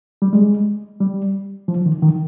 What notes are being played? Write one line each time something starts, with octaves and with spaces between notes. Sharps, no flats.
G3
G#3
G3
F3
D#3
D#3